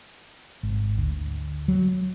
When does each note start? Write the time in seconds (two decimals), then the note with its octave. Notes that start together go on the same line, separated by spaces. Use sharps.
0.63 G#1
0.98 D2
1.68 F#3